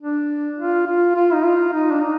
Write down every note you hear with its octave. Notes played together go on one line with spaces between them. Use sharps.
D4
F4
F4
F4
D#4
F4
D#4
D4
D#4